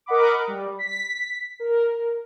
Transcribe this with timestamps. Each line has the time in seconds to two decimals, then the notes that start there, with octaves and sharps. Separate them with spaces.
0.06 A#4 D#5 F#5 B5 D6
0.48 G3
0.79 B6
1.60 A#4